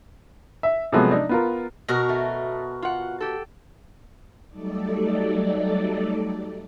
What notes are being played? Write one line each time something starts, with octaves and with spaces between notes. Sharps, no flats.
E5
C3 F3 F#3 G#3 A3 B3
D4 D#4
B3 F4 A#4
B2 F#4 A#4
A3
F4 F#5
G4 A4
F#3 G3 A3 D#4 A4 D5